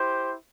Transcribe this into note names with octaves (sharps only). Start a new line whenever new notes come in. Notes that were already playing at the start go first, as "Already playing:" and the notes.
Already playing: E4 G4 C5